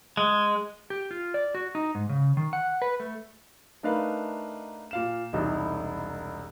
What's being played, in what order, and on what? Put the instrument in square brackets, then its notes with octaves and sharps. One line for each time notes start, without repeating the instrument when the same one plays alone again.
[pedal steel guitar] G#3
[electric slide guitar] G4
F4
D5
F#4
D#4
G#2
C#3
D#3
F#5
B4
A3
[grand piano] A3 D4 D#4 A#4 B4 F5
A#2 F5 E7
E1 C2 D#4